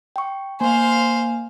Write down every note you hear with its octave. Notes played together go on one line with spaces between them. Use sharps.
G5 C#6
A#3 C5 F5 G#5